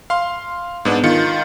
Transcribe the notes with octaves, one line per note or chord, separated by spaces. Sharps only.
F5 C6
G#2 B3 D4
D#3 F4 C#7